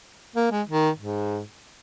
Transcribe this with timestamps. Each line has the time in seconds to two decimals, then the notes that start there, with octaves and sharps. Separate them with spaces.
0.36 A#3
0.52 G#3
0.68 D#3
0.98 G#2